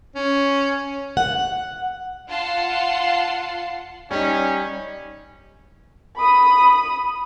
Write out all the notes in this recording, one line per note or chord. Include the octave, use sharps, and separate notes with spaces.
C#4
F#5
F4 F#5 A5 C7
G3 C#4 D#4
B5 D#6